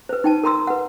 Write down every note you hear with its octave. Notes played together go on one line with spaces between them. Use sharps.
B4 C5
D#4 G5 A5
A#4 A#5 C6 E6
B4 F#5